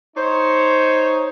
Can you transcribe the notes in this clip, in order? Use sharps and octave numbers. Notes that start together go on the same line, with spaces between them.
D#4 C5 C#5